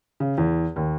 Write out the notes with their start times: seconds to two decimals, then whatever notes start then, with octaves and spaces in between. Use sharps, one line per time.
0.20 C#3
0.38 E2
0.76 D#2